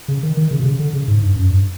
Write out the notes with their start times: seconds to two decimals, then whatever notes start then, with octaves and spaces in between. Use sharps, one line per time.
0.08 C#3
0.23 D#3
0.37 D#3
0.51 C#3
0.60 C3
0.65 C#3
0.79 D3
0.93 C#3
1.08 G#2
1.22 G2
1.36 F#2
1.50 G2